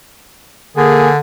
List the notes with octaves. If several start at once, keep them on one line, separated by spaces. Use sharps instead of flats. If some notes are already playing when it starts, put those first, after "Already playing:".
D3 A#3 G#4